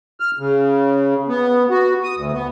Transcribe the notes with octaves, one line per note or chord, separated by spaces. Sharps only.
F6
C#3
B3
F#4
D#6
D2
B3